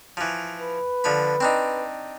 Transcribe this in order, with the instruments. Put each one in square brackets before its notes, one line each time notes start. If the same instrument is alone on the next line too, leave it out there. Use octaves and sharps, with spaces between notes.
[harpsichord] E3 F3
[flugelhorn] B4
[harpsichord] D3 F3 B5
C4 D4 D#4